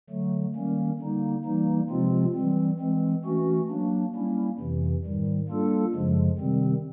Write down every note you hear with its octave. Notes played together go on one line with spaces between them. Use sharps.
D3 F#3 A3
D#3 G3 A#3 C#4
D3 G3 A#3 D#4
E3 G3 A#3 D#4
C3 F3 G#3 C4 F4
E3 G3 C4
E3 G#3 C4
E3 A3 C#4 F#4
F#3 A#3 D4
G3 A#3 C#4 E4
F2 C3 E3
G#2 D#3 G3
G3 A#3 D4 F4 A4
F#2 C#3 F3 G#3
C3 D#3 G3 C4